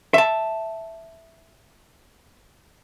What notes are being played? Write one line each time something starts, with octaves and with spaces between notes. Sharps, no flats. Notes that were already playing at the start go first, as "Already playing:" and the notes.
E5 A5